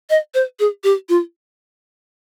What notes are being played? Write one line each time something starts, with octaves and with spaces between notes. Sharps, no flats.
D#5
C5
G#4
G4
F4